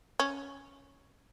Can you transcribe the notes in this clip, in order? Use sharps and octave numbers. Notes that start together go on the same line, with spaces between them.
C#4